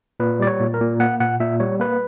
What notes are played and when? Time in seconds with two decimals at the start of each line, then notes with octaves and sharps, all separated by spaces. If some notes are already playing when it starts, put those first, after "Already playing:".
0.20 A#2 B4
0.40 G3 D5
0.47 C#5
0.60 A#2
0.74 A#4
0.81 A#2
1.00 A#3 F#5
1.20 A#2 F#5
1.40 A#2 E5
1.60 G3 C#5
1.80 A#3 B4